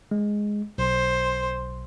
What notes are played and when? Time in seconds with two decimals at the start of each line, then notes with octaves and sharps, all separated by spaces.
0.11 G#3
0.78 B1 C5